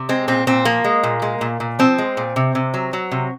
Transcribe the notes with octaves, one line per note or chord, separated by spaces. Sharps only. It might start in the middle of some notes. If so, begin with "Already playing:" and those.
Already playing: C3
G#3 C4
A#2 C4
A#2 C4
F3 A#3
G#3
A#2
G#3
A#2
A#2
F3 C4
G#3
A#2
C3
C3
F#3
F#3
C3